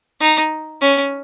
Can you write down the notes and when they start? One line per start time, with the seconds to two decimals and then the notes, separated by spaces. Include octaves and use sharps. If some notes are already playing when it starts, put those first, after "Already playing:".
0.20 D#4
0.81 C#4